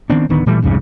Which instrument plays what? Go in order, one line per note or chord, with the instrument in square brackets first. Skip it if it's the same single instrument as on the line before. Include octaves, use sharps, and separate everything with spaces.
[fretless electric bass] D#3 B3 C4 D4
D1 D3 D#3 B3
A#2 E3 G3 A3
C2 F2 G#2 C#3